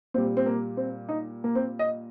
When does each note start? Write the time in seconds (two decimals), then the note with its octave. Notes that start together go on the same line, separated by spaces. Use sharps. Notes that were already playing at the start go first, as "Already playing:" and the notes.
0.14 A#2 G3 C4
0.37 C4
0.46 A#3
0.77 C4
1.09 D#4
1.44 A#3
1.55 C4
1.79 D#5